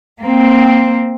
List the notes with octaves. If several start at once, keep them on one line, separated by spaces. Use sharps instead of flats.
A#3 C4